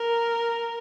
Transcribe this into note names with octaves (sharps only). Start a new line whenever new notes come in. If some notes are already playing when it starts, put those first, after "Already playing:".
Already playing: A#4